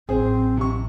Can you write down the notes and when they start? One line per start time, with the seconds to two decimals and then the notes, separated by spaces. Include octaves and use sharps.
0.09 A1 F#3 C4 G#4 C5
0.57 C3 C#6